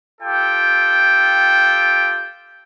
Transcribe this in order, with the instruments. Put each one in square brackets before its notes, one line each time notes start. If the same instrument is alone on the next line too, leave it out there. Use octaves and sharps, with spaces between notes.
[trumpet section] F4 G4 A4 G5